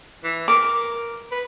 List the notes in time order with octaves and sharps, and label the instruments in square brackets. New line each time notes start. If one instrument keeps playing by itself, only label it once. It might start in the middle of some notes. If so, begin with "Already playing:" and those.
[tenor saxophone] E3
[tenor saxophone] A#4 [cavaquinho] D6
[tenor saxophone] B4